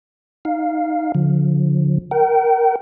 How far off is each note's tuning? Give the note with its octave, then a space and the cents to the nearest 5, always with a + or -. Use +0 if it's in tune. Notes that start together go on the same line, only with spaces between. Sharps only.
D#4 +0 F5 +0
D3 -30 F3 +25
A#4 +0 G5 -35